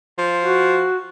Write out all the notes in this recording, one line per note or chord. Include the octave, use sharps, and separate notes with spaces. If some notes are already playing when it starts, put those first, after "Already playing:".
F3
F#4